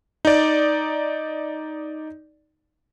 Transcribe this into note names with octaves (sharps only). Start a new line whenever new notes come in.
D#4 D5